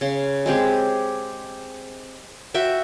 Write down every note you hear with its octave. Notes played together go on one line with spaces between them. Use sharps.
C#3 C6
G#3 C4 G4 G#4
F#4 E5 G5